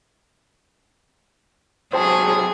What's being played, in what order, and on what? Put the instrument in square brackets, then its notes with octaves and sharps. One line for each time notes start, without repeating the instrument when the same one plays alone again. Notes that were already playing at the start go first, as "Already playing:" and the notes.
[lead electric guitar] C2 F#3 [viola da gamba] G#4 [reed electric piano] C5 G5 A5